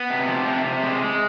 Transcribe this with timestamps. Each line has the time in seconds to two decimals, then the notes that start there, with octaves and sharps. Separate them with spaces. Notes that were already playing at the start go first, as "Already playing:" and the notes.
Already playing: B3
0.10 C3
0.29 F3
0.47 C3
0.65 C3
0.83 G#3
1.02 G#3